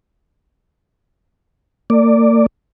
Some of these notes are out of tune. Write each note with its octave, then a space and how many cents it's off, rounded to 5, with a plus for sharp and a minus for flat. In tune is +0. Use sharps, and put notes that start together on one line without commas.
A#3 -40 D5 +0